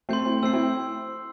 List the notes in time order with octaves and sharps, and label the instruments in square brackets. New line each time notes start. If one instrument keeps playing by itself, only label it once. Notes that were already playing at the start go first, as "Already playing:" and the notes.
[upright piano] A3 C4 [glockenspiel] C6 G6 C7
[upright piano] C4 E4
[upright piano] A3 C4 [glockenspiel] E6 G6 C7
[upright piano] C4 E4